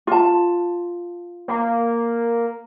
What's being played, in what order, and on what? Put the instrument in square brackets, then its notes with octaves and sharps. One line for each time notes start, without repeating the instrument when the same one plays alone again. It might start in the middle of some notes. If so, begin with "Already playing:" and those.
[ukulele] F4 A5
[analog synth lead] A#3